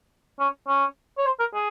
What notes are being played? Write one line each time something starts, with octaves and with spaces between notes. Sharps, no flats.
C#4
C#4
C#5
C5
A#4
G#4